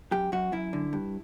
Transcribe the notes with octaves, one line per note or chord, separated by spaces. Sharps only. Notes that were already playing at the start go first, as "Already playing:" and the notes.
F#2 G4
F#2 F#4
F#2 E4
D3
G2